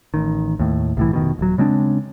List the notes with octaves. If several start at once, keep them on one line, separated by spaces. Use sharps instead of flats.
A1 D#3
D#2 A2
C2 A2 E3
F1 B2 D#3
D#1 F#3
C#3 G#3 C4 D4